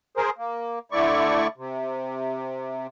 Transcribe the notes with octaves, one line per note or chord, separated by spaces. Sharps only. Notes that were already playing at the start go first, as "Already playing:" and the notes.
G#4 A#4 C5
A#3
D3 A3 E4 D5 C#6
C3